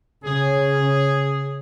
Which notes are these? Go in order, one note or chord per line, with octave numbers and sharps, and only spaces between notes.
C#3 G#4